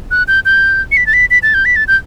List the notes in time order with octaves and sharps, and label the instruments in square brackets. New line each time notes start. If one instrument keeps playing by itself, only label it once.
[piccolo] F#6
G6
G6
C#7
B6
A6
B6
B6
A6
G6
B6
A6
G6